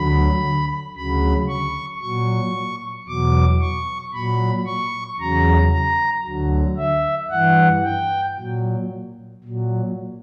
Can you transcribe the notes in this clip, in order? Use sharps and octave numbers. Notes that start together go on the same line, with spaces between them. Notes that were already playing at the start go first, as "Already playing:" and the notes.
Already playing: D2 D3 F#3 B5
D2 C#3 F#3 B5
C#6
A#2 F#3 C#6
E2 B2 F#3 D6
C#6
A#2 F#3 B5
C#6
E2 C#3 F#3 A#5
A#5
D2 D3 F#3
E5
G2 E3 F#5
G5
A#2 F#3
A#2 F#3